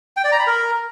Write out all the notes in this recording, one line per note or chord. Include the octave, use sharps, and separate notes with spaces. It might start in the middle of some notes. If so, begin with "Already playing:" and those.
G5
D5
A#5
B5
A#4